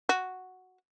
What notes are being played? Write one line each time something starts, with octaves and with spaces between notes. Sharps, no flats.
F#4